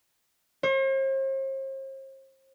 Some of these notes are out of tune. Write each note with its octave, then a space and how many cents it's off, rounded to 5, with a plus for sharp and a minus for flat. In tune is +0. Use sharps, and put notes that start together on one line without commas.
C5 +45